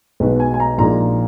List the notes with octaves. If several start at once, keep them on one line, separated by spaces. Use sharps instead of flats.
B1 B2 G#3 B4
G#5
G#5
A#5
A#1 A#2 G#3 D#4 A#5